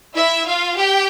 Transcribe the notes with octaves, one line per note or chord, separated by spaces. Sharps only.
E4 E5
F4 F5
G4 G5